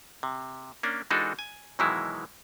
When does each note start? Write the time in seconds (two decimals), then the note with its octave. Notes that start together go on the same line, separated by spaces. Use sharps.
0.23 C3
0.83 A#3 C#4 D4
1.11 E3 G#3 D4 D#4 F#4 A4
1.39 G#5
1.79 B2 D#3 E3 F#3 G#3 E4